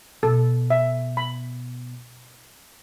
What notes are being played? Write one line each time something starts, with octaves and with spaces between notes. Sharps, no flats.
B2 A4
E5
B5